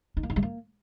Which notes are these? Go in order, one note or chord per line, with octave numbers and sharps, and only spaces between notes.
D#4
A#3
D#4
G#3
A#3